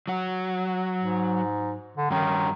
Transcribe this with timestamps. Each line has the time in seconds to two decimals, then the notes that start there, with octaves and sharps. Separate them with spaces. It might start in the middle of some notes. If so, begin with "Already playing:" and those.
0.08 F#3 F#4
1.03 G#2
1.97 D3
2.10 G2 D#3 C#4